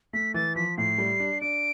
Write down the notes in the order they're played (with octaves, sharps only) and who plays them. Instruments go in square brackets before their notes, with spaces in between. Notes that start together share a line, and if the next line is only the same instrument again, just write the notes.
[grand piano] A3 [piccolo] B6
[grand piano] E3 [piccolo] A6
[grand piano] F3 [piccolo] B6
[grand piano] A2 [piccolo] C7
[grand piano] G3
D4
[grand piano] D4 [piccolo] D7